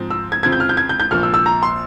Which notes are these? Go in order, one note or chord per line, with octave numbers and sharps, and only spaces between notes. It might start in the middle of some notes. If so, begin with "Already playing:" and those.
Already playing: G#2 F3 C4
E6
G#6
F2 C#3 F3 C4 G#6
G6
F6
G6
G#6
G6
G6
A#1 A#2 F3 A#3 F6
E6
E6
A#5
C6